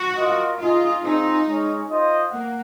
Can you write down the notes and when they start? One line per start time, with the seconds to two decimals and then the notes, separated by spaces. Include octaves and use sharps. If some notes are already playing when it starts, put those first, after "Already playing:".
Already playing: F#4
0.17 F4 A#4 D#5
0.59 D#4 F4 G#4 D#5
1.03 C4 D#4 F4 G#4
1.46 G#3 C#4 G#4 C#5
1.89 F4 C5 D#5
2.31 A#3 F#5